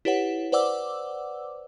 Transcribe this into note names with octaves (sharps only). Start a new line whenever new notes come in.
E4 G4 B4 C#5 F#5
B4 C5 D5 F#5 D6 E6